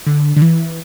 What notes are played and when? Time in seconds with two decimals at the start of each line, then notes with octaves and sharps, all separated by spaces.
0.06 D3
0.36 D3
0.42 E3